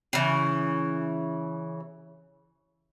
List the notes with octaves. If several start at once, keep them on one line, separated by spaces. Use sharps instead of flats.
C#3 E3